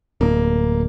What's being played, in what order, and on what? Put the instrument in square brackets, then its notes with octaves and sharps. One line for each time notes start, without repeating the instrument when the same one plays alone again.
[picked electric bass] D1 [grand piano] A#3